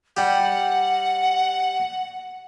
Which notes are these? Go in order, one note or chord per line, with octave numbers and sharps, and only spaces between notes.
G3 G4 F#5